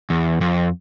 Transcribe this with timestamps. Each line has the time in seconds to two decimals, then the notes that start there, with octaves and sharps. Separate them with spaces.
0.10 E2
0.41 F2